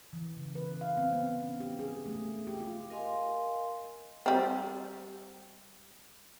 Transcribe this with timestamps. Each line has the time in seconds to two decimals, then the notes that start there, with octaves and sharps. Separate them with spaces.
0.13 E3
0.37 C#3
0.55 B4
0.81 F5
0.97 C4
1.13 B3
1.43 C#4
1.60 G4
1.79 G#4
2.06 A3
2.47 G4
2.60 F4
2.90 A#4 D#5 F5 G#5 C6
4.26 G3 C4